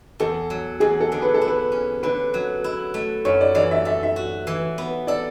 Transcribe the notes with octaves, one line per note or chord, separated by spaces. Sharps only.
E2 A4
F#3
E2 G#4
A4
D3
B4
A4
E4
B4
C#4
D3 B4
F#3
E4
A3
F#2 C#5
D5
E3 D5
E5
A4 E5
E5
F#4
E3
B3
A4 D5